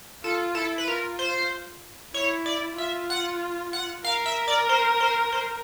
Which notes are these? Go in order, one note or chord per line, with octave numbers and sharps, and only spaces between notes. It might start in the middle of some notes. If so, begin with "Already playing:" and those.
F4 A4
E4 A4
B4
F4 A#4
C5
E4 C#5
D5
F4 E5
F#5
F#5
A#4 F5
E5
D5
C5
C5
C5